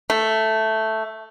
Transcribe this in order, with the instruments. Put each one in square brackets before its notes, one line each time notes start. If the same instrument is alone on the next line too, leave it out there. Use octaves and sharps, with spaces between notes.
[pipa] A3